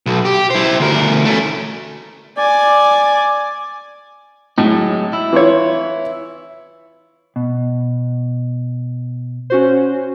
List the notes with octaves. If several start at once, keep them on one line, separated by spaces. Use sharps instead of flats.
B1
G4
E4 C5
D2 A#4
A3 C#4
D5 G#5 D6
A2 F#3 G#3 D#4
E4
E3 F4 C#5
B2
C#4 F#4 C5